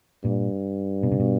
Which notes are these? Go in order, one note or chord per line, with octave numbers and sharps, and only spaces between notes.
G2 A#2
B2
C3
B2